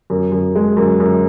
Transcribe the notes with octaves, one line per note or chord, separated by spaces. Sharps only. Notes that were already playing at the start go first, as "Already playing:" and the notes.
F#2
F#2
G#3
F#2
F#2